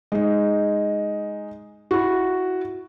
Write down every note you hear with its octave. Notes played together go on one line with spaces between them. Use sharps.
G#3 D#4
E4 F#4